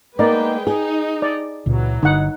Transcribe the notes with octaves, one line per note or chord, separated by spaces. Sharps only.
G#3 A#3 B3 D#4 B4 D5 G5
D#4 G#4
D5
C#2 A#2 C#3 E3 F#3
G1 D3 D#4 F#5